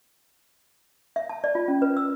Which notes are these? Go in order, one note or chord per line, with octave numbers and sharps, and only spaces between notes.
E5
A5
D5
F4
C#4
B4
E6